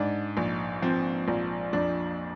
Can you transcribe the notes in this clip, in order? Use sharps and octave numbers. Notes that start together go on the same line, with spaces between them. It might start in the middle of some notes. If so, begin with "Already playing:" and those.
Already playing: G#2 D4
A#1
F3 C4
A#1
F2 D4